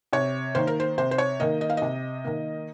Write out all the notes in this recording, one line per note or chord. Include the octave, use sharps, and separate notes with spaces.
C3 C#5
D#3 A#3 C5
A#4
C5
C3 C5
C5
C#5
D#3 A#3 D#5
D#5
F5
C3 D#5
D#3 A#3